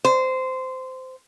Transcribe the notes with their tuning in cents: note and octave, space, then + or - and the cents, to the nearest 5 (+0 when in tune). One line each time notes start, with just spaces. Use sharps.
C5 -15